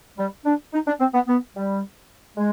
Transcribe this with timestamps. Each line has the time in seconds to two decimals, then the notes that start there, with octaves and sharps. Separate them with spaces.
0.18 G3
0.45 D4
0.74 D#4
0.87 D4
1.00 C4
1.14 B3
1.28 B3
1.55 G3
2.37 G#3